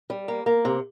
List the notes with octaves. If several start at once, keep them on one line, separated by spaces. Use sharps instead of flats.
G3
A#3
A#3
C3